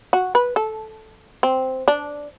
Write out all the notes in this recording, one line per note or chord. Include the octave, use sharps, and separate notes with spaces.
F#4
B4
A4
C4
D4